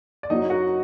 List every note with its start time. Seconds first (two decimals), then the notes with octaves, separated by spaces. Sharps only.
0.23 D5
0.30 F#1 F#2 F#3 D#4 D#5
0.50 F#4 F#5